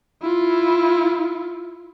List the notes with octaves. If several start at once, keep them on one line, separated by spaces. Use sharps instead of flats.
E4 F4